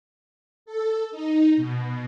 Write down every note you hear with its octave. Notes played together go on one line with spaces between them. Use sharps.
A4
D#4
B2